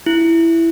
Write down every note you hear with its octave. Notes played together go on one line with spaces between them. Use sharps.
E4